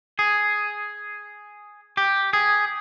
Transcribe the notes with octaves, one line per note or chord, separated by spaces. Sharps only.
G#4
G4
G#4